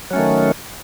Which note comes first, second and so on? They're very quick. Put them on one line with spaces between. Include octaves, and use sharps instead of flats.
F#3 C#4 A3 D#3